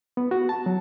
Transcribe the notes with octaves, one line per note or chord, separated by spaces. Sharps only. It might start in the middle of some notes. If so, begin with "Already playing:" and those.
B3
F#4
A5
F#3